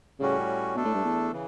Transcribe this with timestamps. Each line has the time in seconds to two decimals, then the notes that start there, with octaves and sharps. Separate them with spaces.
0.20 A2 C#3 G3 C#4 F#4
0.75 B2 A3 D4 A4
0.85 A2
0.95 G2
1.04 E2
1.32 C#3 E3